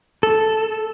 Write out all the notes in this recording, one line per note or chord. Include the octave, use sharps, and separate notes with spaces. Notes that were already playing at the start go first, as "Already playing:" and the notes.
A4